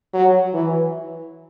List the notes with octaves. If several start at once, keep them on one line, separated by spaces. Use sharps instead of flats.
F#3
E3